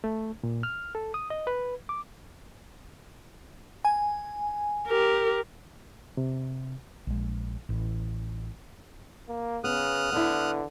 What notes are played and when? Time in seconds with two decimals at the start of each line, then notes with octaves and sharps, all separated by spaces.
0.04 A3
0.43 A#2
0.63 F6
0.95 A4
1.14 D#6
1.30 D#5
1.47 B4
1.89 D6
3.85 G#5
4.88 G4 A#4
6.17 C3
7.07 A#1 G#3
7.69 A1
9.29 A#3
9.64 C#3 B3 D#6 F6 F#6
10.12 D3 B3 E4